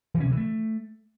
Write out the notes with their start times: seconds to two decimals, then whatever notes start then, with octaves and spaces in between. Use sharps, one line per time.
0.14 E3
0.20 C#4
0.26 C3
0.31 E3
0.37 A3